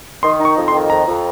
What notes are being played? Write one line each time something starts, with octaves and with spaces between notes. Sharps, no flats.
D#3 C6
D#4
C#6
F2
C6
D#3
F2 A#5
F2